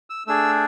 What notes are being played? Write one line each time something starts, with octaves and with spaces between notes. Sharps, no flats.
E6
A3 D4 G#4 E6